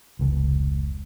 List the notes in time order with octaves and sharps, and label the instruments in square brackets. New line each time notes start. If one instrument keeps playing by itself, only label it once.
[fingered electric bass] F1 C#2